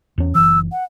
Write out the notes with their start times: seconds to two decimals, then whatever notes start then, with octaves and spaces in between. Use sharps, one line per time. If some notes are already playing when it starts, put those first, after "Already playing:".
0.18 E2 C#4
0.35 F#1 E3 E6
0.72 F#5